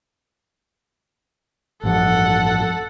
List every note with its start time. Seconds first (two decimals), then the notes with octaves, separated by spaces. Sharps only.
1.83 A1 G2 F3 A4 F#5